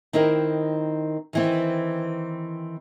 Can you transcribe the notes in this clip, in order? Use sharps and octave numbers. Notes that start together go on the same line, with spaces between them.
D#3 C4 D#4 E4 A#4
D#3 E3 C4